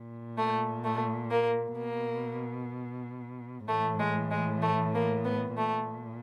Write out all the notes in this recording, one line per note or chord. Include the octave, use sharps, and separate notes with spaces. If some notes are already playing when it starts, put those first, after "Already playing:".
Already playing: A#2
A3
A3
A#3
B2 A#3
A2 E3 A3
G#3
G#3
A3
A#3
B3
A#2 A3